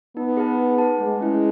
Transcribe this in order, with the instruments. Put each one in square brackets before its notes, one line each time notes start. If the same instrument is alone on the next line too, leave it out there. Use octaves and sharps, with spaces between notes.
[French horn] B3 [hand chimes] D#4
[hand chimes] G#4 B4 F#5 A5
D#4
G#4 B4 F#5 A5
[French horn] G#3 [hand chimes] A3
[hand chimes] C#4 E4 B4